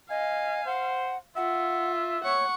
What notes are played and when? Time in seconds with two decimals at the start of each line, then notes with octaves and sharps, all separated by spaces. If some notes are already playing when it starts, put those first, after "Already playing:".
0.10 D#5 F5 G#5
0.66 C5 F#5
1.36 F4 E5 F#5
2.24 C#5 F#5 C#6